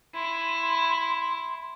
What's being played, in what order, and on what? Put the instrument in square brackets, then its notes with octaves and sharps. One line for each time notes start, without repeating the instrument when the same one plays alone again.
[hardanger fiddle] E4 [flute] C6